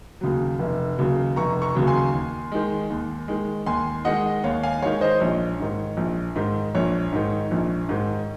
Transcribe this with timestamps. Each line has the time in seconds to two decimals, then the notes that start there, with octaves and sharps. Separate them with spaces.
0.21 D#2 C#3 F#3
0.59 F1
0.98 D#2 C#3 F#3
1.36 F1 A#5 C#6
1.62 A#5 C#6
1.75 D#2 C#3 F#3
1.87 G#5 C6
2.14 D#2
2.52 D#3 G#3
2.90 D#2
3.28 D#3 G#3
3.66 D#2 G#5 C6
4.05 D#3 G#3 D#5 F#5
4.44 D#2 C#5 F5
4.63 F5 G#5
4.82 D#3 G#3 C#5 F5
5.01 C5 D#5
5.20 A#1 C#5
5.59 G#2 D#3
5.97 A#1
6.36 G#2 D#3
6.75 A#1 C#5
7.13 G#2 D#3
7.51 A#1
7.89 G#2 D#3